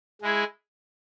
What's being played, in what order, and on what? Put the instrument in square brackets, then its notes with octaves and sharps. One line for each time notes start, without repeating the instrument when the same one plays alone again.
[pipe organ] G#3 E4 G#4